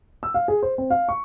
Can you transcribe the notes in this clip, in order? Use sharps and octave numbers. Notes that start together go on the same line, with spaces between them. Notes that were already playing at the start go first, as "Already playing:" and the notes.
E6
F5
G#4
C5
C4
F5
C#6